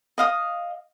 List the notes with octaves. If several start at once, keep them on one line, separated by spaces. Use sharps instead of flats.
D#5 F5 D#6